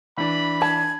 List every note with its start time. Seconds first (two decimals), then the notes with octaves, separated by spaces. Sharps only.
0.17 E3 D4 B5
0.62 A5 G#6